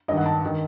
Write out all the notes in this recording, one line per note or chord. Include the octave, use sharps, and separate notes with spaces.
G2 D#3 D#5
F#5
A5
D#3